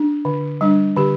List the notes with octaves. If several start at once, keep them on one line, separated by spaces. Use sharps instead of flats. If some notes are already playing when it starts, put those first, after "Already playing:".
Already playing: D4
D3
G3 D4
D3 G4